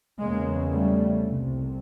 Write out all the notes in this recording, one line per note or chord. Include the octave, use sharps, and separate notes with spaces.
E2 C#3 G#3 A#3
G3 A3
C2 C3